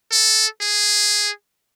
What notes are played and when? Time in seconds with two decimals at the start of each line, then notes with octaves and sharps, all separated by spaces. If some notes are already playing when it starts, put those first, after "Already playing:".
0.12 A4
0.61 G#4